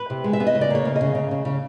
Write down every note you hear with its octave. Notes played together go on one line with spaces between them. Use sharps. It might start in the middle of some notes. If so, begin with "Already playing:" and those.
Already playing: B4
C3
G#3
E5
B3
D#5
C#3
D5
A#3 C#5
C#3
D#5
C#3
C#3
C#3
C#3